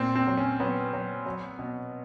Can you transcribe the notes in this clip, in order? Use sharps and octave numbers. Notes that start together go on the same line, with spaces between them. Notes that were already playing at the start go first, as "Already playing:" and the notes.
Already playing: A#2 C4
C4
F#3
C#4
F#3 B3
F#3
F#3
B2